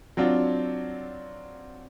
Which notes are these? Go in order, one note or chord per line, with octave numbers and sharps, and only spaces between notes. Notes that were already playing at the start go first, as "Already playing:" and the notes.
F#3 C4 D4 F4